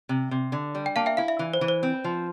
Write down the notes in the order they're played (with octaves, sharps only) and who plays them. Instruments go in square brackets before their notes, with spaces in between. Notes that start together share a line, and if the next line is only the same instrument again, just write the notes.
[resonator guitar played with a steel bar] C3
C3
D3
G3
[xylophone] G5
[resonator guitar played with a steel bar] A#3 [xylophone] F5 A5
[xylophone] E5 G5
[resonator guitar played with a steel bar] E4 [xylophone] F5
[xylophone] E5
[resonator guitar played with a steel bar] E3
[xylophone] C5
[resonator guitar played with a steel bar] E3
[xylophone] C5
[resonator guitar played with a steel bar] C4
F3